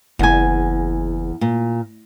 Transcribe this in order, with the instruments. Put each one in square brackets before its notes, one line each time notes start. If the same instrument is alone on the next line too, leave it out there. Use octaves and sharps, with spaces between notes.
[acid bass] F#1 [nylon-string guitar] E2 G#5
[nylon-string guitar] A#2